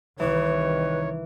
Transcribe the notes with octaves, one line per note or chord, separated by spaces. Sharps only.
C2 D#3 E3 B4 C#5